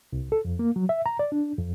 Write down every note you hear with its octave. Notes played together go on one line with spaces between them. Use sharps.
C2
A4
F2
A#3
F#3
E5
A#5
D5
D4
F2